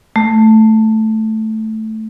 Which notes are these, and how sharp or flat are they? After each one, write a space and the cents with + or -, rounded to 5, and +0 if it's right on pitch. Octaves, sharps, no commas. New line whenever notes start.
A3 -5